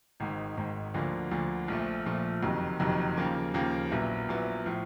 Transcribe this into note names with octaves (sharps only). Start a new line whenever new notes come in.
G#1 G#2 D#3
G#1 G#2 D#3
D2 D3 F3 A#3
D2 D3 F3 A#3
A#1 A#2 F3 A3
A#1 A#2 F3 A3
F#1 F2 C3 D#3 F#3
F#1 F2 C3 D#3 F#3
D#2 C#3 F3 A#3
D#2 C#3 F3 A#3
A#1 A#2 F#3 B3 E4
A#1 A#2 F#3 B3 E4
A2 F3